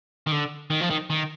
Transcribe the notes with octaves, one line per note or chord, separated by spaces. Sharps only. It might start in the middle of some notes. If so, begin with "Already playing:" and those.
D#3
D3
D#3
F3
D#3
D#3